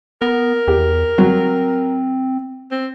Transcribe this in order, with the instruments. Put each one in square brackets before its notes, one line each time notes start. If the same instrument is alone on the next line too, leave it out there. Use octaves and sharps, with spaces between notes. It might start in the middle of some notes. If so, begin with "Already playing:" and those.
[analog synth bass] B3 [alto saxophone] A#4
[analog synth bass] E2 [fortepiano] G4
[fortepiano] F#3 [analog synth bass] C4
[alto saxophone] C4